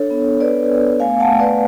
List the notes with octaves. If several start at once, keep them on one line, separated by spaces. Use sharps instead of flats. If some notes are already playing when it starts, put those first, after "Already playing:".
Already playing: D4 A4 C#5
B3
B3 B4 D5
B3
A3 F5 G#5
F#5 A5
A3
B4 D5